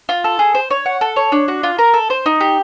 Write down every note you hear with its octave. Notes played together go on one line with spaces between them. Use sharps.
F4
A4
G#4
C5
C#5
F#5
A4
C#5
D4
F#4
F4
A#4
A4
C5
D#4
G4